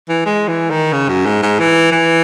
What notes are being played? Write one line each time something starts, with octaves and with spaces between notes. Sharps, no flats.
E3
G#3
E3
D#3
C#3
F#2
G#2
G#2
E3
E3